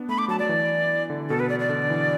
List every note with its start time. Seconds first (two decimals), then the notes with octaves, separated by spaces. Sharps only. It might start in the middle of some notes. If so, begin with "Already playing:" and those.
Already playing: B3 D4
0.09 A3 B5
0.18 D6
0.28 F#3 A5
0.39 F#3 D5
0.49 E3
1.10 D3
1.29 B2 A4
1.40 B4
1.49 D5
1.59 D5
1.69 D3
1.90 E3